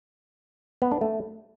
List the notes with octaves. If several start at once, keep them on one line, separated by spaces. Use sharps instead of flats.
B3
D4
A3